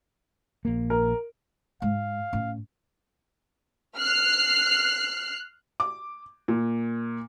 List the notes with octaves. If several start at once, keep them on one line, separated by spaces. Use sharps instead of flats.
A#1 A#3
A#4
G#2 G#3 F5
A2 C#4
F6 F#6 C7
D6
A#2